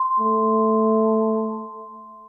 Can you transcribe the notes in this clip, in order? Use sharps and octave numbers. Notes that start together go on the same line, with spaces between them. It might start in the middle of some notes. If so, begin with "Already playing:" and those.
Already playing: C6
A3